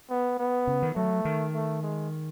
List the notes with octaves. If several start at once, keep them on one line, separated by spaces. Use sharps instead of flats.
B3
B3
C#3
D#3
F#3 A3
D#3
A3
G#3